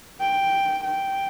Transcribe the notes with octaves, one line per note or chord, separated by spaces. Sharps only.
G5
G5